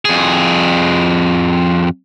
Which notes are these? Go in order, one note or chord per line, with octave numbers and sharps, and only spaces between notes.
F2 G#4